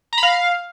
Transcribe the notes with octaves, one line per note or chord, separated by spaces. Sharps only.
A#5
B5
F5